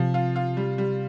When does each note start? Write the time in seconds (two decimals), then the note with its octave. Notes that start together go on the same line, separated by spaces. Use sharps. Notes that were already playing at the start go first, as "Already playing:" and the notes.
Already playing: C3 F3
0.14 F4
0.36 F4
0.57 G3
0.78 G3